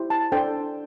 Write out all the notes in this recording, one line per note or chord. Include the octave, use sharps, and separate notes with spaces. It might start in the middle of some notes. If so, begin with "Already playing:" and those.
Already playing: E4 G4 C5
A5
D4 A4 C5 G5